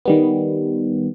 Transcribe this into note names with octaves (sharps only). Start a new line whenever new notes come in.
D#3 G3 B3